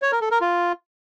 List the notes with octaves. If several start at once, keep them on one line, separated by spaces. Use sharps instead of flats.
C#5
A#4
A4
A#4
F4